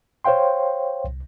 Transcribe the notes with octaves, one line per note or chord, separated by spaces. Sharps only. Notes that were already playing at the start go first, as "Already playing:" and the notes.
C5 C#5 F5 G5 C6
C2